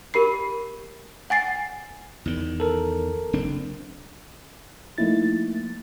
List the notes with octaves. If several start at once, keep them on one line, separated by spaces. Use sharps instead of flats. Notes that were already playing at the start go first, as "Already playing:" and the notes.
G4 A#4 B5 C7
F#5 G#5 A6 C7
E2 D#3
A4 A#4
F#1 C4 D4
F3 A3 A#3 D#4 E4 A6